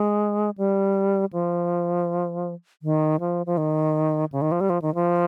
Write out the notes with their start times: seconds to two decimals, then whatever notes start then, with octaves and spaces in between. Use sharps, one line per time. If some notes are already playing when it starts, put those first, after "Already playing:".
Already playing: G#3
0.58 G3
1.33 F3
2.82 D#3
3.20 F3
3.46 F3
3.57 D#3
4.32 C#3
4.42 D#3
4.52 F3
4.61 G3
4.70 F3
4.82 D#3
4.95 F3